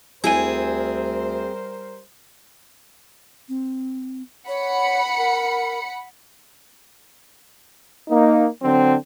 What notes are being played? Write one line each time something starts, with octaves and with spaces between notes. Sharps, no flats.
D2 G3 C4 E4 G#4 A#4 C5 G#5
C4
C#5 F#5 B5 C#7
A#4
A#3 D#4
D3 F#3 C4